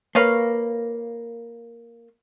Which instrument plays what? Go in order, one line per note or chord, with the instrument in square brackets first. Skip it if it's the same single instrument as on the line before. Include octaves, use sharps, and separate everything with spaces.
[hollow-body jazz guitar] A#3 [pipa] B4 C#5 F5